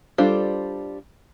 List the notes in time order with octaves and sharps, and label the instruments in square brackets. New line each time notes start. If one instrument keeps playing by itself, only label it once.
[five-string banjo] G3 D4 F4 A4 C5